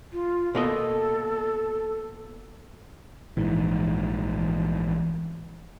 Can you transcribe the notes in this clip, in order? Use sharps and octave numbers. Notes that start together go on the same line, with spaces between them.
F4
B2 A#3 A4 D#5
A#1 G#2 E3